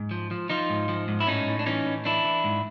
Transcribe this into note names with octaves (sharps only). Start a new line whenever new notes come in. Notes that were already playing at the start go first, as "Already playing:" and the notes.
Already playing: G#2
F3
F3
F3 D#4 F4
G#2
F3
G#2
E4
A2 C#4 D#4
A2
D4
E3 C#4 D#4
A2
E3 D4 E4
E3
G#2